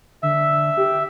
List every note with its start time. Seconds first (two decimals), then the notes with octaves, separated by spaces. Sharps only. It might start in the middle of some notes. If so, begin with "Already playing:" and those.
0.23 D3 E5
0.77 G4